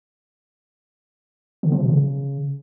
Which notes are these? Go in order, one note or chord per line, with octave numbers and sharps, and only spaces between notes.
D3
F3
B2
C#3